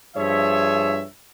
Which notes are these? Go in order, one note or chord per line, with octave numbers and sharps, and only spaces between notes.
G2 F3 G#4 C#5 E5